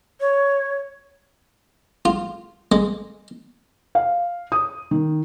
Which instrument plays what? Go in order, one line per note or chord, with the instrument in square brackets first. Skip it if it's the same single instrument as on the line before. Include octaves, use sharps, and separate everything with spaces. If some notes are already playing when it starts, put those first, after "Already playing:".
[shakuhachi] C#5
[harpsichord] F4
G#3
[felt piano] F5
D#6
D#3